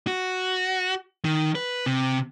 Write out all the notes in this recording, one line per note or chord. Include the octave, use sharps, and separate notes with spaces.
F#4
D#3
B4
C3